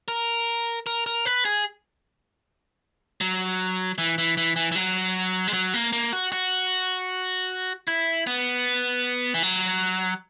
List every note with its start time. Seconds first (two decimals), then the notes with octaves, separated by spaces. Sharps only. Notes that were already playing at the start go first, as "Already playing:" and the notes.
0.08 A#4
0.87 A#4
1.06 A#4
1.25 B4
1.45 G#4
3.21 F#3
3.98 E3
4.18 E3
4.37 E3
4.56 E3
4.72 E3
4.75 F#3
5.48 G#3
5.53 F#3
5.74 A#3
5.93 A#3
6.13 F#4
6.32 F#4
7.88 E4
8.27 B3
9.34 E3
9.43 F#3